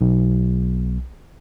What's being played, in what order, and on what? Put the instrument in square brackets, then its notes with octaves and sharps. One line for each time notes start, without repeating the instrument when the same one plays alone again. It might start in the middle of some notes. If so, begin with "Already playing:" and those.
[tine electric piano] B1